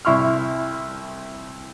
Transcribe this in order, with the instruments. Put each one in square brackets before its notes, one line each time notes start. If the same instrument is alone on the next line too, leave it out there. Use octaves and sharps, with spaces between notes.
[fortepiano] C2 E4 C6 C#6 F6